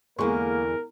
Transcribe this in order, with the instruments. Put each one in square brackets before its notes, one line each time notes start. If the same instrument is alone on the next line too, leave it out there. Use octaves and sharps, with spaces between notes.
[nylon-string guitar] E2 D3 [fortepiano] G#3 C#6 [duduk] A#3 [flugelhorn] A#4